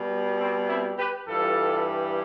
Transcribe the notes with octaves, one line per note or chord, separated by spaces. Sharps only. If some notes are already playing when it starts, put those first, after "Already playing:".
Already playing: B2 G3
C4
C4 E4
G4 B4
G2 E3 G3 F4 A4